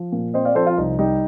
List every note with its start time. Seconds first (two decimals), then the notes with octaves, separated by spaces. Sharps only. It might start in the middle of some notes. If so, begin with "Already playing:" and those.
Already playing: F3
0.12 A#2
0.34 C4 C5 D#5
0.45 D5 F5
0.55 F3 A4 C5
0.67 F4
0.77 C2 D#4
0.99 G3 D#4 G4